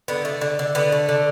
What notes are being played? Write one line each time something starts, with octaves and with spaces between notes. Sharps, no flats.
D3 B3
A3
D3
D3
D3 B3
A3
D3